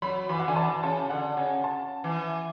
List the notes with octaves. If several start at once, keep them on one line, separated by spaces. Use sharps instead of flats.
F#3 B5
E3 B5
F#5
D3 G#5
E3 A5
C#3 A5
D3 F#5
C#3 G#5
A5
E3